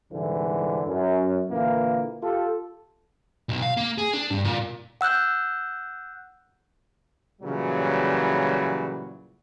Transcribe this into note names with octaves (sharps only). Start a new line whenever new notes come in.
C2 G#2 D3 E3
F#2
A#2 D3 E3 A#3
F4 G4 A4
B1
F5
A#3
G#4
D4
G2
A#2
F#5 E6 F#6 G6
A#2 C#3 E3 F#3 G3